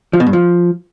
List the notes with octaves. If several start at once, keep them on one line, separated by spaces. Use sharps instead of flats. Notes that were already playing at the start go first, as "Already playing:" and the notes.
F3
B2
G2
F3